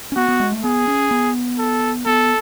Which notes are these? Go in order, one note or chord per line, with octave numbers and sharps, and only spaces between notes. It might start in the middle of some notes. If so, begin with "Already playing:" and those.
C#4
B3 F#4
B3
G#3
A3
B3 G#4
C#4
B3
A4
B3 A4